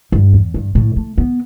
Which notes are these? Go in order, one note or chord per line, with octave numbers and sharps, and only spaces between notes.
G2
E2
G2
A2
A3
B3